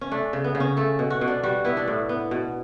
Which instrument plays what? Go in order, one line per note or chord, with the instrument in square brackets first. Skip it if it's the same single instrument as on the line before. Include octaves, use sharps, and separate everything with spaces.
[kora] C#4
A3 D4
C#3
B3
C#3
C#4
A3 A4
B2
F#4
B2
D4
G3 F#4
B3 E4
D4
A2
B3
B2